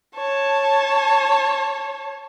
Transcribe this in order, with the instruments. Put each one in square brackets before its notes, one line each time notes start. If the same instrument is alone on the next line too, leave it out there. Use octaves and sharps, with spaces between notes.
[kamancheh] C#5 A5